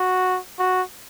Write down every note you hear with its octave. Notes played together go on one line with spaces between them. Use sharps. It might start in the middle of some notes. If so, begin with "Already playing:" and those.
Already playing: F#4
F#4